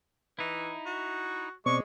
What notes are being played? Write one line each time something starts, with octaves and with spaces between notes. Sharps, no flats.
E3 D#4 E4
F#4
B2 G#3 C4 D5 C#6